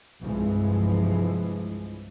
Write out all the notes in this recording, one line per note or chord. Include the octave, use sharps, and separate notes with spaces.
C2 G2 E3 F3 G#3